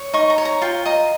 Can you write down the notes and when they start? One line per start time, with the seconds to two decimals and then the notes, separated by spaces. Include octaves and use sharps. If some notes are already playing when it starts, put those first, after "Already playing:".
Already playing: C#5
0.14 D#4 C#6
0.30 A#5
0.38 C#5
0.45 A#5
0.62 F4 G5
0.85 D#5 A#5